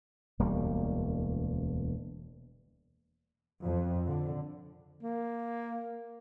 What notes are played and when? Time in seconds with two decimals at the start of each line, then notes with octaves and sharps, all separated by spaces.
0.39 E1 D2 G3 A#3
3.63 F2
4.07 D3
5.03 A#3